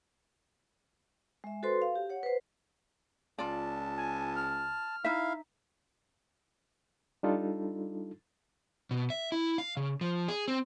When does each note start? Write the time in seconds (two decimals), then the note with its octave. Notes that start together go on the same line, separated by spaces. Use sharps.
1.44 G#3 E5
1.63 F#4 A4 B4 C5 C6
1.82 F5
1.96 G4
2.10 C#5 F#5
2.23 B4 C5
3.39 C#2 F4 D5 A5
3.96 G#5
4.35 F6
5.04 D#4 E4 E5 F5
7.23 G3 D4 D#4 F4 A4
8.91 B2
9.10 E5
9.32 E4
9.58 F5
9.77 C#3
10.01 F3
10.28 G#4
10.48 C4